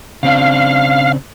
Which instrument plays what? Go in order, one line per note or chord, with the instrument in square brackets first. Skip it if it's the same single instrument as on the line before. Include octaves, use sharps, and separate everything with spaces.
[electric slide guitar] C#3 C4 D4 [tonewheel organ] F5